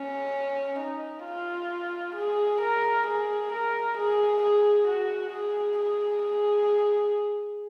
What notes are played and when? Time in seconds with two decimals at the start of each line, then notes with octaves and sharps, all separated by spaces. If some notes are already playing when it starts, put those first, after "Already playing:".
Already playing: C#4
0.79 D#4
1.24 F4
2.15 G#4
2.61 A#4
3.06 G#4
3.52 A#4
3.97 G#4
4.42 G#4
4.87 F#4
5.32 G#4
5.78 G#4
6.23 G#4